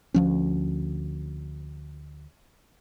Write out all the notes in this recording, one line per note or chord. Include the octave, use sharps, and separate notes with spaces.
D2 F3 C#4